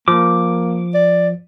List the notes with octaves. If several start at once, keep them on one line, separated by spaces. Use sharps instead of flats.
F3 A#3 D6
D5